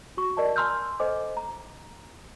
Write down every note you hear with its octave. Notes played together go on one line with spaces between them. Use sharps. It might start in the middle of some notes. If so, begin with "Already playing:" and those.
F#4 C#6
A#4 D5 D#5 A5
G#5 A#5 C6 E6 F6 G6
A4 C5 D#5 G#5 D6
A#5